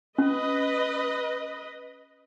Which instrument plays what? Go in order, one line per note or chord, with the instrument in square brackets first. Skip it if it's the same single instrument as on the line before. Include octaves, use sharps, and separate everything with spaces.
[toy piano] C#4 [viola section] B4 D#5